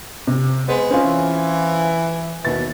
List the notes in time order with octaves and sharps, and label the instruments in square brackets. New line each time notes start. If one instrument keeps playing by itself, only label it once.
[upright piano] C3
[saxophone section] G#3 B3 [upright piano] C5
[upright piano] C4 C#4 F4
[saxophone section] E3
[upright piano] D#2 A6 [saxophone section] B2 E3